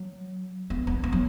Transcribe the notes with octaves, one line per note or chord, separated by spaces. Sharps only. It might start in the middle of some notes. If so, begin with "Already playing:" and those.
Already playing: F#3
B3
B3
B3
F#3